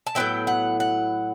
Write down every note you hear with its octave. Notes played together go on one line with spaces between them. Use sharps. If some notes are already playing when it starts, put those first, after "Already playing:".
A5
A2 F#3 B3 E4 G5
F#5
F#5